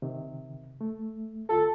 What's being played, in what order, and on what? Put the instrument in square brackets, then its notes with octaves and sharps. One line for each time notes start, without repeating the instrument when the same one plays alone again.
[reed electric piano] C3 D#3
A3
[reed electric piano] D2 F4 A5 [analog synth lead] A4